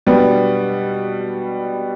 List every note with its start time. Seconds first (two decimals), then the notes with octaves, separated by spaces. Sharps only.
0.06 B2 G3 B3 D4